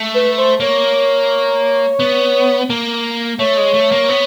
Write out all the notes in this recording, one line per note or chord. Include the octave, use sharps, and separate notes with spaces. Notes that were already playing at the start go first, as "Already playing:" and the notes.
Already playing: A3
B4
C5
A#3 C#5
B3
A#3
A3 C#5
G#3
A3
A#3
B3